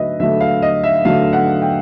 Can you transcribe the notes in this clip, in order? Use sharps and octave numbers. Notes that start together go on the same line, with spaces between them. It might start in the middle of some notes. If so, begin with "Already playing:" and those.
Already playing: D3 F#3 A3 B4 D#5 E5
D3 F#3 A3 E5
F5
D#5
E5
D3 F#3 A3 F5
F#5
G5